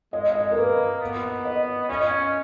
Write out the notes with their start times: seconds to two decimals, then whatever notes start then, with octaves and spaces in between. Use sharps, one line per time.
0.13 G#3 D#5
0.35 D#5
0.51 A#4
0.57 A#3 B4
1.01 B3
1.45 D#5
1.89 C#4 D#5